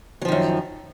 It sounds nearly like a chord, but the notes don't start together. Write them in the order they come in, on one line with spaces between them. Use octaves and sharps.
F#3 F3 D#3 F#2